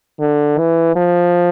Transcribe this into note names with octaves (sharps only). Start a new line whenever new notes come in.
D3
E3
F3